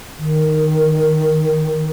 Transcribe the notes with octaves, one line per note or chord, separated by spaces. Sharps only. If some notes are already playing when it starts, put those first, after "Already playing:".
D#3